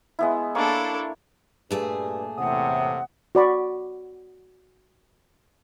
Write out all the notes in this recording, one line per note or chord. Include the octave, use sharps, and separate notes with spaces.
G#3 B3 E4
A#3 D4 E4 A4 C#5 C#6
G2 A#2 A3 G#4
E2 A2 C3 F#5 D#6
F#4 D5 B5 C#6